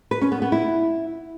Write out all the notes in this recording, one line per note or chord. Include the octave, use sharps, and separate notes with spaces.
B4
C#4
B3
B3
E4